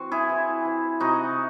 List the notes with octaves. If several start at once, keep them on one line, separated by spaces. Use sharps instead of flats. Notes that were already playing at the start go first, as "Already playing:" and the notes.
Already playing: E3 C4 F#4
E4 G#4
E3
E3
C3 D#4 F#4